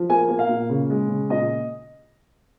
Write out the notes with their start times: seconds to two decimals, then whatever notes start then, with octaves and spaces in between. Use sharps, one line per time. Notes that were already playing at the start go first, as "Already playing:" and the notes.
Already playing: F3
0.09 A#3 G#5
0.29 A#3
0.39 F5
0.49 A#2
0.70 C#3
0.90 G#3
1.09 C#3
1.30 A#2 D#5